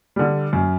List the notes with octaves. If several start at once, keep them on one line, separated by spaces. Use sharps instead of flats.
D3 G3
F#2